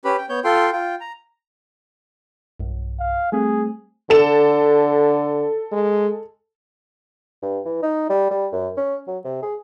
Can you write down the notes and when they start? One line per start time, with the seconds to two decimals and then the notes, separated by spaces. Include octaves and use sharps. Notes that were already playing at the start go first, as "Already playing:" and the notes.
0.05 C#4 G4 B4 B5
0.18 G5
0.29 B3 C#5 G6
0.44 F4 A4 G5 C6
0.73 F4 G5
1.01 A#5
2.60 B1 G2
3.00 F5
3.32 G3 A3 C4 G#4
4.10 D3 A4 E7
5.72 G#3
7.43 G2
7.65 E3
7.83 D#4
8.09 G3
8.31 G3
8.52 F#2
8.77 C#4
9.08 F#3
9.24 C3
9.43 G#4